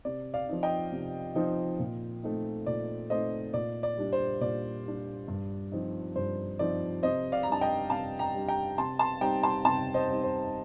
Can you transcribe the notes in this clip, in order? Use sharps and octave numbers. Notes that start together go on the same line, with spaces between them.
C3 D5
D5 F5
F3 C4 D#4
D#5 G5
C3
F3 C4 D#4
A#2
A3 C4 D#4
A#2 D5
A3 C4 D#4 C5 D#5
A#2 D5
D5
G3 D4
C5
A#2 D5
G3 D4
G2
F3 C4 D#4
G2 C5
F3 C4 D#4 D5
C3 C5 D#5
D5 F5
G3 A#5
D4 A5
D#5 G5
C3 F5 A5
G5 A#5
G3 D4
G5 A#5
C3 A5 C6
A5 C6
G3 C4 D#4 G5 A#5
A5 C6
C3 A5 C6
C5 D#5
G3 C4 D#4
C5